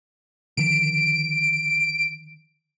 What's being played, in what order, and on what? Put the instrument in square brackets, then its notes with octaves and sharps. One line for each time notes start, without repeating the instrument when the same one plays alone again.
[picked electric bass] D3 D#3 F3 [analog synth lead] D7